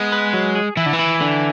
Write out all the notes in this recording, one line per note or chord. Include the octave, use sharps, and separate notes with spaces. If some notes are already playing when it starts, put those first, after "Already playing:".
Already playing: G#3 B3
B4
F#3
G#4
E3 E4
D3
E3
E4
D3